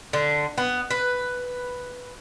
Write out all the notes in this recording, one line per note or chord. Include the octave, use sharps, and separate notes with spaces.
D3
B3
B4